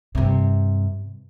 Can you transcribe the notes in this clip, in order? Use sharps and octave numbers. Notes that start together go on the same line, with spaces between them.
G2 C3